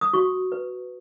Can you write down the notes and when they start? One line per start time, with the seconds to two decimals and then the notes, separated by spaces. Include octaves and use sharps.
0.01 D#6
0.13 F#4 C#6
0.52 B4